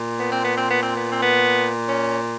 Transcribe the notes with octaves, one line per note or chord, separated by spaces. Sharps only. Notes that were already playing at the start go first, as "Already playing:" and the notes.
Already playing: A#2
B3
C4
B3
C4
B3
C4
B3
C4
B3
C#4